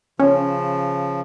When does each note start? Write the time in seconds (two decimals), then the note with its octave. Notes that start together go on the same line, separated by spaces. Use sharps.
0.20 C#3 F3 C#4